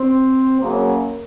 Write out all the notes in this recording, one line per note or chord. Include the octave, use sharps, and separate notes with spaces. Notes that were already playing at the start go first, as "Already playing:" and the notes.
Already playing: C4
F#2 C#3 F#3 A#3